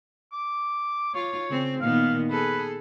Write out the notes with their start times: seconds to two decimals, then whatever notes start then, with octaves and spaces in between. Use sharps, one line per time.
0.32 D6
1.14 F4 C#5
1.50 C#3 C4
1.81 A#2 D#3 B3 F5
2.30 G#4 A4 B4